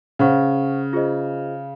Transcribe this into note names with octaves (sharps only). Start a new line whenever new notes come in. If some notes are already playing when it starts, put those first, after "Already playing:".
C#3 C5 F#5 C#6
F4 G#4 C5 D#5